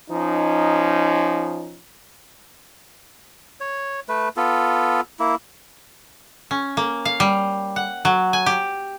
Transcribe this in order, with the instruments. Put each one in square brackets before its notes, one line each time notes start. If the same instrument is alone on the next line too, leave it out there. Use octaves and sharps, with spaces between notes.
[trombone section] F3 C#4 D#4
[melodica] C#5
A3 B4
B3 F4 A4
A#3 E4
[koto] C#4
A#3
F5
G3
F#5
F#3
G#5
G4